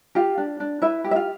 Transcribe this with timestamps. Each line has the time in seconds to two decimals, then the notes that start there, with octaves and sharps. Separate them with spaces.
0.15 F4 G4 F5
0.38 D4
0.60 D4
0.82 E4 B4 E5
1.04 G4
1.11 E5
1.16 F4 F5